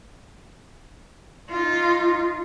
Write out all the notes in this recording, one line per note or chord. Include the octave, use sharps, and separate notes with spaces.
D#4 F4